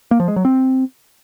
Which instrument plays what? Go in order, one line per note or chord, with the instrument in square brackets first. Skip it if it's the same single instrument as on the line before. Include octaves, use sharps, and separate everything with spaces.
[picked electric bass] A#3
F3
G#3
F#3
C4